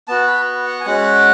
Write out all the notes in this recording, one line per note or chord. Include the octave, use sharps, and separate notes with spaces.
B3 F#4 A5
B5
F#5
G#5
G#3 C#4 F#4 F#5